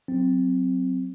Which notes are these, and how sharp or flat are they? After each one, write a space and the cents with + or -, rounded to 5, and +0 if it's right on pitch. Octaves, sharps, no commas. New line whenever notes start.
F#3 +0 C4 +0